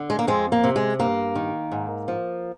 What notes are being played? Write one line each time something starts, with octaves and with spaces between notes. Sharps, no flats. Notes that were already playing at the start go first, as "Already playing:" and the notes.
Already playing: D3
G#3
A#3
F2 G#3 C4
A#3
C3
G#3
G2 A#3
D#3
G#2
F3